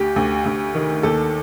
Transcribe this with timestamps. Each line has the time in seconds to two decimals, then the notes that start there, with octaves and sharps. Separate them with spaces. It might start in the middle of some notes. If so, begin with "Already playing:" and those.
Already playing: D2 G4
0.16 D2
0.46 D2
0.75 D#3
1.03 D#2 A4